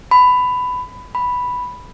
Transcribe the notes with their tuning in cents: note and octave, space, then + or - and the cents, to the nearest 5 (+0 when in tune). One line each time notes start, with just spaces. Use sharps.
B5 +15
B5 +0